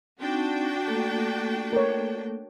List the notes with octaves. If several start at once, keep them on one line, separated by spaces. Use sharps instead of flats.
C4 D4 D#4 F#4 G5
A3 A#3 A4
A#4 C#5